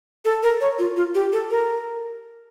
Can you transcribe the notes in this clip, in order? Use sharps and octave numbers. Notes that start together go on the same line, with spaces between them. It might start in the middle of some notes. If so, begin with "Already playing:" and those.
A4
A#4
C#5
F4
F4
G4
A4
A#4